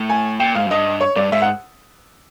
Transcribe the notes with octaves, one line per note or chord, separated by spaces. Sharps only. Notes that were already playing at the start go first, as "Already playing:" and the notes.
Already playing: A2
G#5
A#2 G5
G#2 F5
F#2
G2 D#5
C#5
G2 D5
G#2 E5
F#5